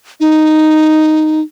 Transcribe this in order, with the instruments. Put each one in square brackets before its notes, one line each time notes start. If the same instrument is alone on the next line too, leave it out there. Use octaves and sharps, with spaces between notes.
[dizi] D#4